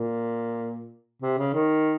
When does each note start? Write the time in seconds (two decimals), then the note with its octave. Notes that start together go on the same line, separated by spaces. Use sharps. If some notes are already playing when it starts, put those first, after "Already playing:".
Already playing: A#2
1.22 C3
1.38 C#3
1.54 D#3